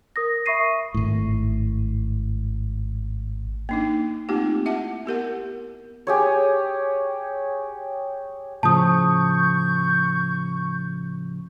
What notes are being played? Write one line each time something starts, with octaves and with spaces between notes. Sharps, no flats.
A#4 D#6 A#6
E5 B5 C#6 A#6 C7 D#7
C#6
G#1 A2
A#3 D4 D#4
A3 A#3 C4 D#4 F4 G4
E4 E5 F#5 A5
B3 G4 A#4 F#5
G4 G#4 C#5
A2 C#3 F3 A5 C#6 D#6 G6